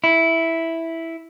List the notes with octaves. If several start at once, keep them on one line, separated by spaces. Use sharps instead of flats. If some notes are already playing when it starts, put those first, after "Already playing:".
E4